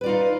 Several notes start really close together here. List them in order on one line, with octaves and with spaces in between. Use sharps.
B4 D5 F4 D#4